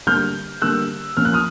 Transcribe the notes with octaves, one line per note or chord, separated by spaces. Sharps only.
D3 G3 A#3 F6 G6
D3 G3 A#3 E6 F#6
A#2 F3 A#3 C#4 F6
F#6
D#6 F6